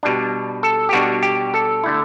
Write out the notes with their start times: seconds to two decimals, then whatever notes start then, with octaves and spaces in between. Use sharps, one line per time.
0.03 B2 G3 D4
0.63 A4
0.89 G4
0.93 B2 G3 D4 F#4
1.23 G4
1.54 A4
1.84 D3 A3 E4